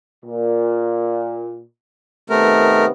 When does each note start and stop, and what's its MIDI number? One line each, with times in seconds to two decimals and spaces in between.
0.25 1.60 46
2.30 2.91 48
2.30 2.91 51
2.30 2.85 57
2.30 2.91 59
2.30 2.85 70